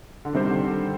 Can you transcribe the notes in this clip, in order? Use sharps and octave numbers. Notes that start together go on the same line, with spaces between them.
D3
C3 D#3 G3 C4 G4 C5
D3
D3